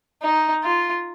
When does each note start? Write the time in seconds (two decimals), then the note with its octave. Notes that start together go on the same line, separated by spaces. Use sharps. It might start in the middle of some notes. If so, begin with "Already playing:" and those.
0.22 D#4
0.64 F4